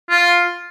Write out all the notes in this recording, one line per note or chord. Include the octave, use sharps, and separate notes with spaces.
F4